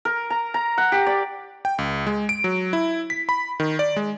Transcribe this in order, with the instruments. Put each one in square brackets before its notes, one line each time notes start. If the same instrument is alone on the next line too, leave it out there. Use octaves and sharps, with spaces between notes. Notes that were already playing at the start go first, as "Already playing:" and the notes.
[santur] A#4
A#5
A#5
F#5
G4
D5
[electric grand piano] G5
C#2
G#3
D7
F#3
E4
B6
B5
D#3
D5
G#3